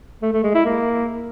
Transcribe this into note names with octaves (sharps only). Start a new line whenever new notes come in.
A3
A3
G#3
E4
A#3